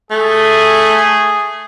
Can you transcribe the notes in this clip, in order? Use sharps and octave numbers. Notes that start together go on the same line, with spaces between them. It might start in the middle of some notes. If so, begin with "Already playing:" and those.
A3 G#4